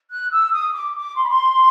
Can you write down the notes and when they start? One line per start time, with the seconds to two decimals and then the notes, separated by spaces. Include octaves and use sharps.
0.10 F#6
0.31 E6
0.53 D#6
0.73 D6
0.95 D6
1.16 C6
1.23 B5
1.30 C6